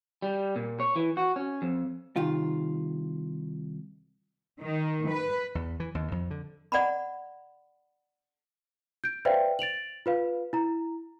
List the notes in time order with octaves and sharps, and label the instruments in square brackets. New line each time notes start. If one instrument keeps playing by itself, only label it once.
[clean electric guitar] G3
A#2
C#5
E3
F#4
C#4
F2
[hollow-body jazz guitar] C2 D#3 F4
[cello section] D#3
B4
[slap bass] E2
E3
D#2
F2
D3
[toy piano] D5 F#5 A#5 B5
[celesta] G6 D7
B4 C5 D5 E5 F5 G5
A6 D7 F7 F#7
F4 B4 F5
E4 A#5